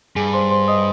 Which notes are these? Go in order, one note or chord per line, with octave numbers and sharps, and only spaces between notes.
G2 G#4 G#5
C5 C6
C5 C6
D#5 D#6